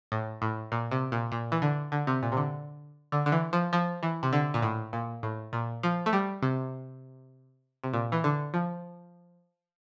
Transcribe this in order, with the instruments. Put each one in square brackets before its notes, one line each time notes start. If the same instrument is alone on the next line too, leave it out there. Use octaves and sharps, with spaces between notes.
[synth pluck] A2
A2
A#2
C3
A#2
A#2
E3
D3
D3
C3
A#2
C3
D3
D3
D3
E3
F3
F3
E3
C3
D3
A#2
A2
A#2
A2
A#2
F3
A3
G3
C3
C3
A#2
E3
D3
F3